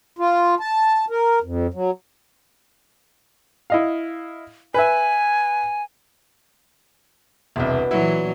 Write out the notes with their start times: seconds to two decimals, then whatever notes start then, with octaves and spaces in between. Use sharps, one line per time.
0.19 F4
0.60 A5
1.10 A#4
1.44 F2
1.74 F#3
3.70 E4 D#5 F5
4.74 B4 E5 G#5
7.56 E1 C2 B2 B3 D4
7.91 A#2 E3 F#3 E4 F#5